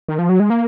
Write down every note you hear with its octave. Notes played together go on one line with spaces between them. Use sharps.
D#3
F3
F#3
G#3
A#3